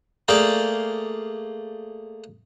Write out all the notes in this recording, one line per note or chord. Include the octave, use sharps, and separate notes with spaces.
A3 A#3 G#4 D5 F5 G5